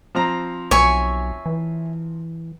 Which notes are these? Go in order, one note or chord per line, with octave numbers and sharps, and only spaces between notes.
F3 C4 A#5
B1 C#5 E5 G#5 C#6
E3